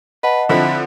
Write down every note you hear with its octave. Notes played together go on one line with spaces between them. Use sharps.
B4 D#5 F#5 A5
D3 F3 C4 E4 F#5